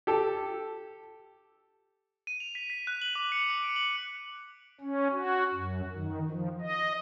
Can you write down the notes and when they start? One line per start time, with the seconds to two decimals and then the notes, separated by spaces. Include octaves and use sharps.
0.07 G4 A4
2.27 D#7
2.40 F7
2.55 B6
2.70 B6
2.87 F#6
3.02 F#7
3.15 D6
3.32 C#7
3.50 D6
3.63 D7
3.76 F#7
4.81 C#4
5.12 F#4
5.54 F#2
5.96 D#3
6.30 F3
6.61 D#5